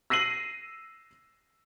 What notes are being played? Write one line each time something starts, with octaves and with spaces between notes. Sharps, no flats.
E6 A#6 C7 D#7 F#7